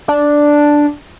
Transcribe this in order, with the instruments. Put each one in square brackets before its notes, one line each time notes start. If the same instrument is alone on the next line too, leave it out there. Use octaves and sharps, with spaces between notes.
[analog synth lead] D4